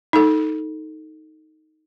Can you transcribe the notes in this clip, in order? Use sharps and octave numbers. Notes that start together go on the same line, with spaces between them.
D#4 A4